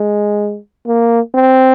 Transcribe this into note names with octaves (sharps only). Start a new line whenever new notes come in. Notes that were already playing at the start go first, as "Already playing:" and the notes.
Already playing: G#3
A#3
C4